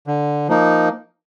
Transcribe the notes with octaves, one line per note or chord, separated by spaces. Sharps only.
D3
F3 A#3 D#4